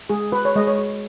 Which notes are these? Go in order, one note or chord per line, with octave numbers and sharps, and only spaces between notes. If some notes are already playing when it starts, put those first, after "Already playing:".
G#3 G#4
F#4 B4
C#5
G#3 D#5
C#5
F#4